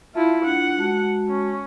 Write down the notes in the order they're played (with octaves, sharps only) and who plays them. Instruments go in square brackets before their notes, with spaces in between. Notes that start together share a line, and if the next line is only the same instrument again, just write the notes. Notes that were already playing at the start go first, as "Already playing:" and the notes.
[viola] E4 F4 [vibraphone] E5 A5
[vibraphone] D4 F4 [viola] F#5
[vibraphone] G#3 F#4 A5
[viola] C#4